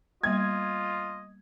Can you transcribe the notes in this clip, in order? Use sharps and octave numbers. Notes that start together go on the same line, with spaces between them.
G3 A#3 B3 F4 D#5 G#6